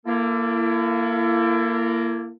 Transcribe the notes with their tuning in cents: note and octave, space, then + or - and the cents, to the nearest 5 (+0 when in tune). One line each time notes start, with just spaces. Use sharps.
A#3 +0 E4 +35 A4 +25